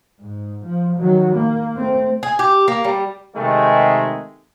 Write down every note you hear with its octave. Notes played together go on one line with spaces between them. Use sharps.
G#2
F3
D#3 F#3
A#3
A3 C4
G#4
G4
A#3
G3
C3 D#3 G#3 A3